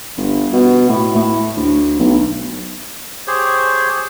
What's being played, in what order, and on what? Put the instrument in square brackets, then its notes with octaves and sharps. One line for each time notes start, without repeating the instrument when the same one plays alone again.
[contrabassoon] G1
B2
A2
A2
D2
B1
[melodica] G4 G#4 C5 C#5